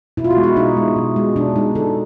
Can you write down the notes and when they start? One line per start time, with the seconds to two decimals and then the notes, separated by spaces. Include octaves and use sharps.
0.17 B2 E4
0.24 F4
0.30 F#4
0.37 G#3
0.43 E4
0.56 B2 D#4
0.77 G#3
0.96 B2
1.16 G#3
1.36 B2 D4
1.56 G#3 D#4
1.75 D3 A4